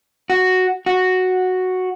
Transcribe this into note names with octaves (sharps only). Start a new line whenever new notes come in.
F#4
F#4